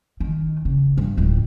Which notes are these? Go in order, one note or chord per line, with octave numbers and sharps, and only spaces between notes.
D#3
C#3
G2
D1 F2